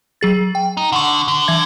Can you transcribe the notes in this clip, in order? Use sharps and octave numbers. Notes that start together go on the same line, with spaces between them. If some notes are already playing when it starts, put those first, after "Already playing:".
F#3 G#4 A6
G5
D#4
D3 F#5 C#6
D3
E3 E5 G#6